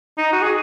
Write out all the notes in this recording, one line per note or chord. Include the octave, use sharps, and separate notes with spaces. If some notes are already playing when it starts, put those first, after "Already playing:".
D#4
F#4
G#4